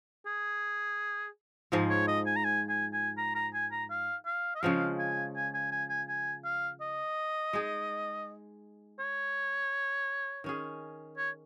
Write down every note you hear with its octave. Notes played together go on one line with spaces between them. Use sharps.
G#4
G#2 F3 G#3
C#5
D#5
G#5
A#5
G#5
G#5
G#5
A#5
A#5
G#5
A#5
F5
F5
D#5
C#3 F3 G#3 F5
G#5
G#5
G#5
G#5
G#5
G#5
F5
D#5
G#3 D#4 G#4
C#5
D#3 C#4 G#4
C#5